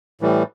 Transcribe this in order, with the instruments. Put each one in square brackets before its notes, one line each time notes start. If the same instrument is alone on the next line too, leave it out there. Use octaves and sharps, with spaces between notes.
[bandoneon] A2 E3 G3